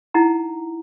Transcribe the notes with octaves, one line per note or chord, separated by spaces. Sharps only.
D#4 E4 F#5 A#5